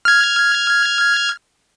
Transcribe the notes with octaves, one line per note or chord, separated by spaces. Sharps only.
F6 G#6